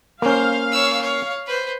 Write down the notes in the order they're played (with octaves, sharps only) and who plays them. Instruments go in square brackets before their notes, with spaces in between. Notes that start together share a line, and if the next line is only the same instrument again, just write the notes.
[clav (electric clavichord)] A#3 C#4 [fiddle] C5 [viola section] F5
[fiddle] C#5 E6
C#5
B4 C5